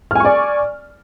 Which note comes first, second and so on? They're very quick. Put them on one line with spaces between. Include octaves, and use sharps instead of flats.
F6 G#5 C#6 D5